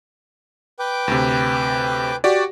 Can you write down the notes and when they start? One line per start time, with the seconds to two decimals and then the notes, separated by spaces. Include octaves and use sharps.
0.79 B4 G5 D6
1.08 D2 C3
2.24 F#4 G4 D5